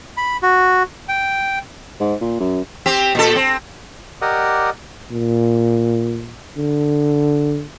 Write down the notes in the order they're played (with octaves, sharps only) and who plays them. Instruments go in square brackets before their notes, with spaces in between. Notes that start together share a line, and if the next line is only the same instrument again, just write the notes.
[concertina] B5
F#4
G5
[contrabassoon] G#2
A#2
F#2
[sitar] C4 G4
A#2 A4
C4
[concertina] G4 A#4 D5 D#5 F#5 D#6
[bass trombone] A#2
D3